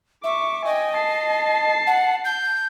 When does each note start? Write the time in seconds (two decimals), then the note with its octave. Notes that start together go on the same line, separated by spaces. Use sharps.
0.24 E5 C#6 D6
0.65 D#5 G5 G#5
0.95 A5 C7
1.87 F#5
2.25 G6